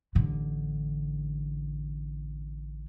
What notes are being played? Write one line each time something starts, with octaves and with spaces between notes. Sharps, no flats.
A1 D3